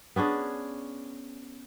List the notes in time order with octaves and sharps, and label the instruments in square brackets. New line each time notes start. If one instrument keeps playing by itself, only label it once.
[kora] B3 C#4 D4 G#4